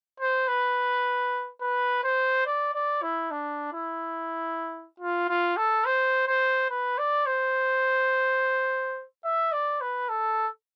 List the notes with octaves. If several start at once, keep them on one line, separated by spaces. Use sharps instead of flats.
C5
B4
B4
C5
D5
D5
E4
D4
E4
F4
F4
A4
C5
C5
B4
D5
C5
E5
D5
B4
A4